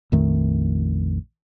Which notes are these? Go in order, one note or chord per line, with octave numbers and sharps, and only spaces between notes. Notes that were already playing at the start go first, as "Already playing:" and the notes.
A#1 F2 D#3 A3